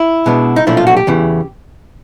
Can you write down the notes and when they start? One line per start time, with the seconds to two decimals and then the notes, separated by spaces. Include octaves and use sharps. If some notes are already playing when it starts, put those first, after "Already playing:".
Already playing: E4
0.26 B2 G#3 B3 D4
0.56 D#4
0.67 B1 A#2 F3 A3 D4 E4
0.77 F4
0.87 F#4
0.96 G4
1.07 E2 C#3 E3